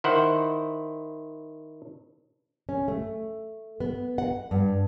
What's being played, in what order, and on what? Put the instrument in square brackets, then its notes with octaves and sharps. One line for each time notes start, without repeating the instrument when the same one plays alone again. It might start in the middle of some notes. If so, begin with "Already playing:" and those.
[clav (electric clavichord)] D#3 E4 C5 F#5
[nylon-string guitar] C#4
A3
B3
F#5
G2